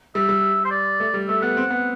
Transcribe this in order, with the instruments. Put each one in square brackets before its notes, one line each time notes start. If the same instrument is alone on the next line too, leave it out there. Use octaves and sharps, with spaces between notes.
[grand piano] G3 [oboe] E5
[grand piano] G3
[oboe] C5
D5
[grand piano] A3
G3
[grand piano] A3 [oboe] E5
[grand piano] B3 [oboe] F#5
[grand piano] C4
B3